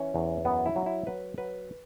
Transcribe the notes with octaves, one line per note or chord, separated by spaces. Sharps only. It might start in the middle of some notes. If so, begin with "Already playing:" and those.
Already playing: E3 C#4
E2
F#2 B3
E4
F#3
E4
F#3 B4
F#3 B4